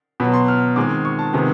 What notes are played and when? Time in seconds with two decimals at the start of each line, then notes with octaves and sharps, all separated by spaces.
0.20 B2 F#3 B3 B5
0.33 C6
0.48 F6
0.76 D#3 G#3 C4 D6
1.05 C#6
1.19 A5
1.33 C3 D#3 G#3 B3